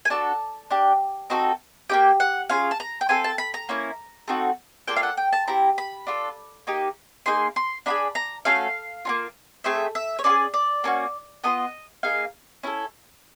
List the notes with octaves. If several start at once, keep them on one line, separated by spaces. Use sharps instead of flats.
G#5
D4 F#4 A4 A5
D4 G4
C4 D#4 F#4 A4
A#3 D#4 G4 G5
F#5
C#4 F4 G#4 F5
A5
A#5
G5
C4 F4 A4 G#5
A5
B5
A#5
A#3 C#4 E4
A3 C4 D#4 F#4
A#3 D4 F4 A4 G5
F5
F#5
G5
A5
C4 E4 G4 A#5
B5
D4 F4 A4
A#3 D#4 G4
A#3 D#4 G#4 C6
C6
D4 F4 G#4 B5
A#5
A3 C#4 F#4 A4 F5
A#3 C#4 F4
A3 C4 G#4 E5
E5
C#5
C#4 F4 D5
G#4
D5
A#3 C#4 F#4
B3 D4 F4 D#5
A#3 D#4 G#4 F5
C#4 E4 A4